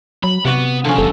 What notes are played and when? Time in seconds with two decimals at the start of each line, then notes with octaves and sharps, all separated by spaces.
0.24 F#3 B5
0.45 C3 B3 F#4 D5 F#5
0.85 D3 F3 C#4 F5 B5
0.98 F#1 D2 G3 A4